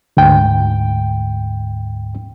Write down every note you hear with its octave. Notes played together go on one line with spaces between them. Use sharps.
D2 G#2 G5